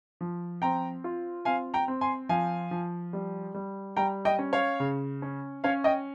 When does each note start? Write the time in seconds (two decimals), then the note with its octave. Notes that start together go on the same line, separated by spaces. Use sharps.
0.21 F3
0.62 C4 G5 A#5
1.04 F4
1.45 C4 F5 G#5
1.74 G5 A#5
1.88 C4
2.01 G#5 C6
2.29 F3 F5 G#5
2.71 F3
3.13 G3
3.54 G3
3.97 G3 G5 A#5
4.25 D#5 G5
4.39 C#4
4.53 C#5 F5
4.80 C#3
5.22 C#4
5.64 C#4 C#5 F5
5.84 D#5 G5